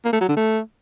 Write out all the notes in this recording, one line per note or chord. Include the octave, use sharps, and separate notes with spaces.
A#3
A3
F#3
D3
A3